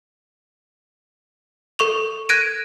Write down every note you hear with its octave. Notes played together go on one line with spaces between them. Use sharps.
A4 C#6 F7
F#6 G#6 A#6 D7 D#7